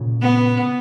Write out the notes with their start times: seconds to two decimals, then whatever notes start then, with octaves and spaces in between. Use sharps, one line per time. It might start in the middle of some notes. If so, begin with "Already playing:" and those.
Already playing: A#2 C#3
0.21 B3